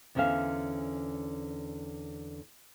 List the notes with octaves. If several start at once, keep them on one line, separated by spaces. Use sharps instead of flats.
E2 D3 C#4 C5 E5 F5